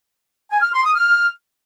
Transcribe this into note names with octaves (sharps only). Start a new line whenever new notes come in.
G#5
F6
C6
D#6
F6